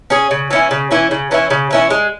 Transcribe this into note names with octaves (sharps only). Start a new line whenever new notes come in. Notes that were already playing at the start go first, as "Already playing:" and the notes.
C#4 G#4
C#3
E3 C#4 E4
C#3
E3 C#4 E4
C#3
E3 C#4 E4
C#3
E3 C#4 E4
G#3